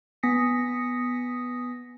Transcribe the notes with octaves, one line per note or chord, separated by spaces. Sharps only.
B3 G#5 D#6 A#6 B6 C#7